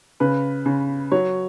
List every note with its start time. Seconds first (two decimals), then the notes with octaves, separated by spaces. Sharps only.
0.20 C#3 B4
0.66 C#3
1.12 F#3 C#5